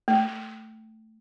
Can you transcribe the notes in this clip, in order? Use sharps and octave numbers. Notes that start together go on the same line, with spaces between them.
A3